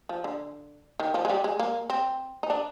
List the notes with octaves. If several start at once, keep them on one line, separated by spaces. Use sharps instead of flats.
F3
D3
D#3
F3
G#3
G3
G#3
A#3
C4
D#4
D4